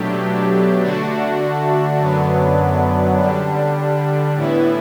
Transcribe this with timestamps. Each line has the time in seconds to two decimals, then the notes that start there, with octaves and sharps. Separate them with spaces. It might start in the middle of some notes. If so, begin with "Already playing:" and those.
Already playing: B2 F#3 A3 D4 G4
0.82 D3 A3 D4 F#4
2.00 F#2 D3 F#3 B3 D4
3.19 D3 G3 D4
4.37 A2 E3 B3 E4